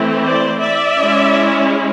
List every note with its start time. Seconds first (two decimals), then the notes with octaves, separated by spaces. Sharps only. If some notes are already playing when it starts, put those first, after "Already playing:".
Already playing: E3 A3 C4 E4
0.23 C5 D5
0.60 D5 E5
0.98 G#3 C#4 E4